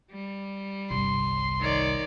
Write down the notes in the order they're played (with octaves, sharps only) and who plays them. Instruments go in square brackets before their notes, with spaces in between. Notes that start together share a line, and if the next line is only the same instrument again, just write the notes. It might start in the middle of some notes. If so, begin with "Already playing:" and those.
[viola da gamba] G3
[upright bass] G1 C2 [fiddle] C6
[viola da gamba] D#3 C#5 D5